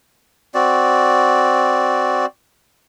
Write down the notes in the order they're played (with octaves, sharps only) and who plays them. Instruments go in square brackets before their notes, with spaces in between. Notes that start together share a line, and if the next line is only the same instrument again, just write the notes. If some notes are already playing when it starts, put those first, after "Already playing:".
[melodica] C4 F#4 D5